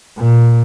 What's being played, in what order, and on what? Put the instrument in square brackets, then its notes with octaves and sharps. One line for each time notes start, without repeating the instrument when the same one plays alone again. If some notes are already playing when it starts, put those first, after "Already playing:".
[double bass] A#2